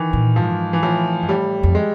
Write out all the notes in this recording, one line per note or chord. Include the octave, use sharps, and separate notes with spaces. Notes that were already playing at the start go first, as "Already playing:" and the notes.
Already playing: D#3 E3
A#2
G#2 F3
E3
A2 F3
G#2
A2 G3
F2
G#3